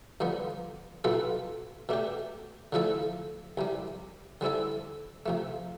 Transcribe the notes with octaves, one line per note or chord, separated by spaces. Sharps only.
G2 D3 F3 B3
B1 B2 B3 F4 A4
B2 A3 D4 G4
D3 F3 A3 E4 A4
C2 C3 G3
D3 G3 C4 E4 A4
C3 F3 A3